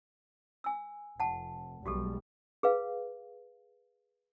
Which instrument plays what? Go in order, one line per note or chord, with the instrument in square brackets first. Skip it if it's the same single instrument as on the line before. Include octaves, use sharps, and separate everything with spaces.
[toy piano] G#5 E6
[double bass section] F1 [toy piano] F#5 A5
[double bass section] B1 G3 G#3 [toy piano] F#4 G4 A4
[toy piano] G#4 B4 F5